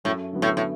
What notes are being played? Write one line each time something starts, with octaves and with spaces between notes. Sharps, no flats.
F#2 A2
D3 F#3 B3
A2
A2